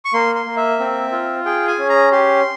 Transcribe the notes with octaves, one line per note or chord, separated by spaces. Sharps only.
C#6
A#3 C6
C6
A#3
E5
C4
F4
G#4 G5
G#5
C#4
A#5
G4 C6